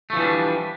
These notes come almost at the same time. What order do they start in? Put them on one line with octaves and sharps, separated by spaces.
A3 F3 E3 G3 D4